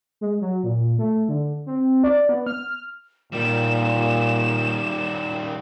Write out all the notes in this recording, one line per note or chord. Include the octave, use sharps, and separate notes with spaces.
G#3
F#3
A#2
A3
D3
C4
D5
B3
F6
A#2 D#3 G3 E7